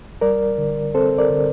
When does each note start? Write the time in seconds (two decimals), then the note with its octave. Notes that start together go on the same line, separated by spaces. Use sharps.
0.21 G3 A#4 D5
0.58 D3
0.95 C4 A4 C5
1.18 A#4 D5
1.30 D3